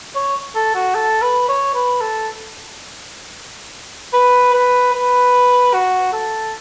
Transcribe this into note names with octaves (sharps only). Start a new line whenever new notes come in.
C#5
A4
F#4
A4
B4
C#5
B4
A4
B4
B4
B4
F#4
A4